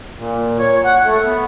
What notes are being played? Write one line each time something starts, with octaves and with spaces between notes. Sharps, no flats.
A#2
C#5
F#5
A3
B3